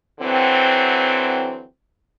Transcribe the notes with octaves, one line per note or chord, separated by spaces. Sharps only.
D3 E3 F#3 C4